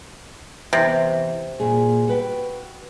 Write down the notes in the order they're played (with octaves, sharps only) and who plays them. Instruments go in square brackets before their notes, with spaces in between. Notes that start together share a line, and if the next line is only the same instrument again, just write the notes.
[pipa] C3 [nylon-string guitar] E3 B3
[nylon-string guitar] A#2 G#4
F#4 B4 G5